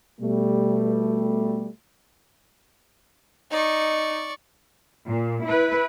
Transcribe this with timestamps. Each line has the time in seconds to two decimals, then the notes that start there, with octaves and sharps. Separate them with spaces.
0.20 B2 G3 A3
3.51 D#4 D5 C#6
5.08 A#2
5.45 E4 B4